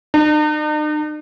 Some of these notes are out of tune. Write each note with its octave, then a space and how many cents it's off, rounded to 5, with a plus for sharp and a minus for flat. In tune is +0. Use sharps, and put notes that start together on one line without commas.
D#4 -45